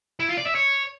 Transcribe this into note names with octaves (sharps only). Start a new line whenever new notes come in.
E4
F4
D5
E5
C#5